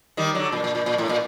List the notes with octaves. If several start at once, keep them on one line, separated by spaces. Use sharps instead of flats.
D#3 G3
D3 F#3
A#2
A#2
A#2
A#2
A2
A#2